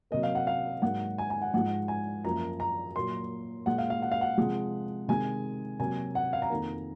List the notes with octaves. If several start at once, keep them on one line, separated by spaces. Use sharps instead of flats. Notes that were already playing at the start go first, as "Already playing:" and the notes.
C3 F#3 A#3 D#5
F5
F#5
F5
G#2 F#3 A#3 F#5
G#5
G#5
F#5
G#2 F3 G#3 F#5
G#5
F#2 F3 A#3 A#5
A#5
A#2 F#3 A#3 C6
A#2 G#3 F#5
F5
F5
F#5
F5
F#5
C3 F3 G#3
C3 D#3 G#3 G#5
C3 F#3 A#3 G#5
F#5
F5
A#5
F2 D#3 A#3